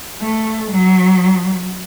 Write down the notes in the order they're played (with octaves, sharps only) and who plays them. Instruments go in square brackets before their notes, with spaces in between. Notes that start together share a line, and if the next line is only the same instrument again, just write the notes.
[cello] A3
F#3